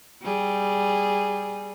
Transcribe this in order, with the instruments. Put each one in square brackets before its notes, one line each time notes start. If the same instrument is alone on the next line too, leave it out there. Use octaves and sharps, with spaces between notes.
[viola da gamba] G3 G#4